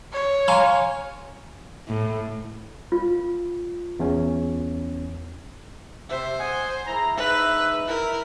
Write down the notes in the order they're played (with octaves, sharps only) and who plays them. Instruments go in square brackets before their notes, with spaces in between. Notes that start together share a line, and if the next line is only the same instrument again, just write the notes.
[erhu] C#5
[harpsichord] F5 [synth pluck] G#5 A#5 C6
[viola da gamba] A2
[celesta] F4
[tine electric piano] E2 C#4
[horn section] C3 E5 [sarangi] C5
[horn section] D#5 F#5 G#5
G#3 E4 A#5
[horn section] G#3 D#4 E5 [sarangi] B4
[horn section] E4 [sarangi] A#4